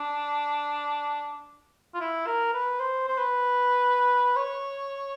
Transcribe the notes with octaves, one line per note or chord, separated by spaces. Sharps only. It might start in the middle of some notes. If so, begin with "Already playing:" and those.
Already playing: D4
F4
E4
A#4
B4
C5
C5
B4
C#5